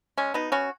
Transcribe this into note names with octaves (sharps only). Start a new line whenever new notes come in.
G#3 C#4
B2 B3 D#4
B3 C#4 F#4